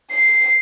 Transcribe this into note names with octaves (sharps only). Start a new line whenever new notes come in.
C7